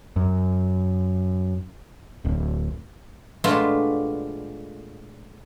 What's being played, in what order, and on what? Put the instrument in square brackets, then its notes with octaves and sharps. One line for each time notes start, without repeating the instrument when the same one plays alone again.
[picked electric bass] F#2
D1
[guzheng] A#2 G#3 A3 B3 D4 F4